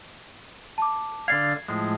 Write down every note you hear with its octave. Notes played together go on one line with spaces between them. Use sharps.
A5 D6
D3 D5 F5 G#6 C7
A2 F3 G#3